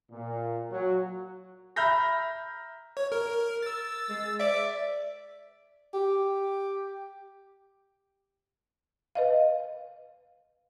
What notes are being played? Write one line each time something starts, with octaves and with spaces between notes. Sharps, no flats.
A#2
F#3
E5 A#5 B5 F6 G6 A#6
C#5
A#4
E6 A6
G#3
D5 E5
G4
B4 D#5 F5